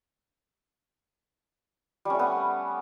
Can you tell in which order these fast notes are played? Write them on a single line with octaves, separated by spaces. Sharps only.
G3 C#4 A3 B3